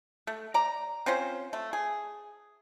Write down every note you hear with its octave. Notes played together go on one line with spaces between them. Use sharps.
A3
D5 A#5
C4 C#4 F4 C5
A3
G#4